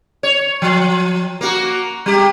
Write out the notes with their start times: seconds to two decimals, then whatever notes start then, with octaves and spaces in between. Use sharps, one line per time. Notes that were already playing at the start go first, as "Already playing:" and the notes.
0.23 C#5
0.62 F3
1.41 A#3 F#4
2.06 G3 G4